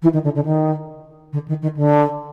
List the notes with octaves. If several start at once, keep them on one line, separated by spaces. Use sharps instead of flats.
E3
D#3
D3
D3
D#3
D3
D#3
D#3
D3